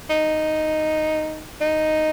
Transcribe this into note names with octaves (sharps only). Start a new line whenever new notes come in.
D#4
D#4